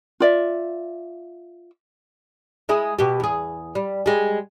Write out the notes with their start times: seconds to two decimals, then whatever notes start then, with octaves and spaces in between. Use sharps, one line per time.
0.20 F4 D5 E5
2.69 G#3 E4 G#4
2.99 B2 G4
3.20 E2 G#4
3.75 G3
4.06 G3 G#3